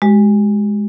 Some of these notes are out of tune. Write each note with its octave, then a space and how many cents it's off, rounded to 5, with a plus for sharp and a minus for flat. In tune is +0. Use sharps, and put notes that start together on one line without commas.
G#3 +0 G4 -35